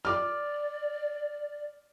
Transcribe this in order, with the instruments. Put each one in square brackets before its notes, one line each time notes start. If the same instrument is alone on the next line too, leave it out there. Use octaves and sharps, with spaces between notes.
[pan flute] D5 [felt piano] D6 F6